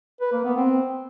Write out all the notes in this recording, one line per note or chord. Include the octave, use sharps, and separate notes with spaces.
B4
A#3
B3
C4